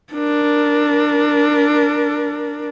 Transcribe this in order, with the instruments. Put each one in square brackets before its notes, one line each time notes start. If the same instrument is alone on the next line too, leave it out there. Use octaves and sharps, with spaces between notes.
[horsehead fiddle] D4 A#4